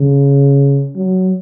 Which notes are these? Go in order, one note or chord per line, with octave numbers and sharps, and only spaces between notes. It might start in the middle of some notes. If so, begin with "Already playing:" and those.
Already playing: C#3
F#3